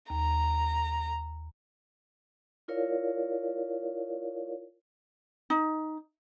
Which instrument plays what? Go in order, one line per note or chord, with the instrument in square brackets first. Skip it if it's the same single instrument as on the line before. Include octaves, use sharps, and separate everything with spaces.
[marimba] D#2 [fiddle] A#5
[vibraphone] E4 F4 A#4 C#5 D5 F5
[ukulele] D#4